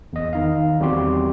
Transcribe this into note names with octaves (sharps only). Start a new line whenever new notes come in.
E2 D#5
D#3 D#4 F5
E2 G3 C4 F#4 G4 C6